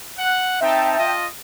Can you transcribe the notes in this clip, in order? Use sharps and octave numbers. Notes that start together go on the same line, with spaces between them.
F#5
C4 D#4 E5 G5 A5
F4 D#5